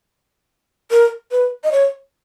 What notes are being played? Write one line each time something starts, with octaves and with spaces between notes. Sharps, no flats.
A#4
B4
D#5
C#5